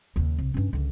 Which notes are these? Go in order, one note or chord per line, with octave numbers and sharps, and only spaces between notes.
D#2 C#3
C2
G2 C#4
C#2 D3